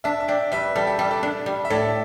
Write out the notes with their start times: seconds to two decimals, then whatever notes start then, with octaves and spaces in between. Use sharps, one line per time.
0.04 D4 E5 A5
0.20 E5
0.28 D4 D5 G5
0.52 G3 B4 E5
0.75 G3 A4
0.87 G4
0.99 G3 A4
1.11 A4 D5
1.23 D4
1.46 G3
1.65 E5
1.70 A2 A4 D5